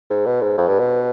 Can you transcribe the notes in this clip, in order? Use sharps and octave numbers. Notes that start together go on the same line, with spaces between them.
G#2
B2
G#2
F2
G2
B2